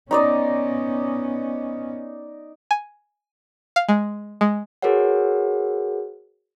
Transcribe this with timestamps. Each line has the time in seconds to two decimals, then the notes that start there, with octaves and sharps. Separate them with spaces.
0.11 B3 C#4 D#4 D5 D#5
2.71 G#5
3.76 F5
3.89 G#3
4.41 G#3
4.82 F#4 G#4 A#4 B4 C#5 F#5